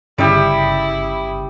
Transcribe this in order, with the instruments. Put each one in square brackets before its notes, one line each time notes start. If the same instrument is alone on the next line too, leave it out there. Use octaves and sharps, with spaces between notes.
[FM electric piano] G1 C#3 D#6 [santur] G3 G4 [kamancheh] E4